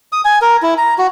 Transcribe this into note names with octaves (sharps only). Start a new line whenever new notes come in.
D#6
G#5
A#4
E4
A#5
F#4